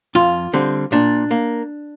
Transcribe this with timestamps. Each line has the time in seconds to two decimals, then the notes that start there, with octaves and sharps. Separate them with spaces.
0.15 F2 F4
0.53 D3 G3 C4
0.92 A#2 D4
1.31 A#3